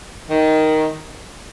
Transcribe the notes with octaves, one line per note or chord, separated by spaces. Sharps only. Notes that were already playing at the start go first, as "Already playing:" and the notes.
D#3